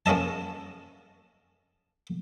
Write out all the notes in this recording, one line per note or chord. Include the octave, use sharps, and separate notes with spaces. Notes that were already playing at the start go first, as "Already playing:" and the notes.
A#3 C#4 G#4 D#5 A5